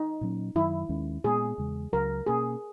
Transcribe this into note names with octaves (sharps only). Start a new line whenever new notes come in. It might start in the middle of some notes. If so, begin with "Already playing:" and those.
Already playing: D#4
A#2 F#3 C#4
F#2 D#3 F#3 E4
D#2 D#3 G#3 C#4
A#2 G#3 B3 G#4
E2 C#3 G#3
C#2 C#3 F#3 A#4
B2 A#3 C#4 G#4